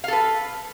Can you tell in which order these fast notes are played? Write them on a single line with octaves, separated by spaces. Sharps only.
F5 A4 B4